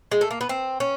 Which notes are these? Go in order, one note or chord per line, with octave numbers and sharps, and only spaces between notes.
G#3
A3
A#3
B3
C4
C#4